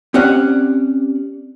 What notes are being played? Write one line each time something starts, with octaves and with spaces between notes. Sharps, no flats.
C4 C#4 G4 D5 F#5